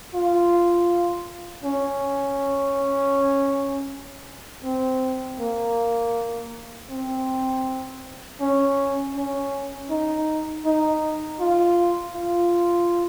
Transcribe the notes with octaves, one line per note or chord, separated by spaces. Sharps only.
F4
C#4
C4
A#3
C4
C#4
C#4
D#4
D#4
F4
F4